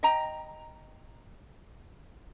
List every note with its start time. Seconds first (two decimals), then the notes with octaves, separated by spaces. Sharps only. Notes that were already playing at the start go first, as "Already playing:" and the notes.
0.03 D#5 G5 A#5